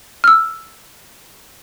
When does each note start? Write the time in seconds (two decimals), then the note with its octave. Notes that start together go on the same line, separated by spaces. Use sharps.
0.24 E6 F6